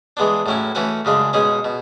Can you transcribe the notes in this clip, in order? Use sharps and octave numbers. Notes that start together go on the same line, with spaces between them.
E3 G#3 B3 D4
A2 F#3 C#4 E4
E3 A3 C#4 F#4 B4
F#2 C#3 G#3 D4
B2 G#3 C#4 G#4
B2